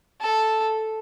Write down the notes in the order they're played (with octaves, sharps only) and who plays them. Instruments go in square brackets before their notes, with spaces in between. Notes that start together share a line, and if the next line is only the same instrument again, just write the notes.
[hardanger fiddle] A4